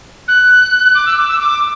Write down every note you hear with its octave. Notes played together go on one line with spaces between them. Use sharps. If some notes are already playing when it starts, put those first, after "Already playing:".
F#6
D6
E6
D6
E6
D6